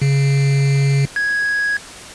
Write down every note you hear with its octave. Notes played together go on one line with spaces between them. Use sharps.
C#3
G#6